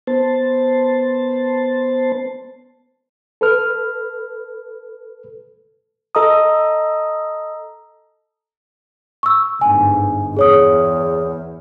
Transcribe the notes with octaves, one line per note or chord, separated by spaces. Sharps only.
B3 C5 A5
A4 B4 F6
A4 D#5 A#5 D#6
C#6 E6
G1 G#2 G#5
E2 G#4 C#5 D#6